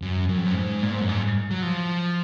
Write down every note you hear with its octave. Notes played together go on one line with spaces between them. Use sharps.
F#2
F#2
F2
F#2
G#2
A#2
G#2
F#2
G#2
F#3
F3